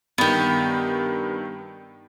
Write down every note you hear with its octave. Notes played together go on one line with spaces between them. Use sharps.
G2 D#3 B3 G4